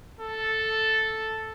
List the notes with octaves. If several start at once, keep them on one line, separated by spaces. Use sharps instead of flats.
A4